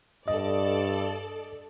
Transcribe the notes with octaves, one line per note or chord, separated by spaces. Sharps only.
G2 A4 D5 D#5